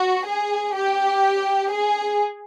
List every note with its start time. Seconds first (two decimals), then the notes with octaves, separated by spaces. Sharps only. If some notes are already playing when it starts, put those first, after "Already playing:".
Already playing: F#4
0.26 G#4
0.74 G4
1.70 G#4